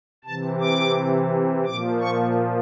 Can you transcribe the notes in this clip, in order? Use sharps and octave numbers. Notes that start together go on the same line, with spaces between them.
C3 E3 A5
D6
A#2 F3 D6
C#6